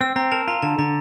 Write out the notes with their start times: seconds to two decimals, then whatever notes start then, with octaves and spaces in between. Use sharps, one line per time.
0.01 C4 E6
0.16 C4 A#5
0.32 A#4 A5
0.48 F4 A#5
0.62 D3 A5
0.78 D3 A#5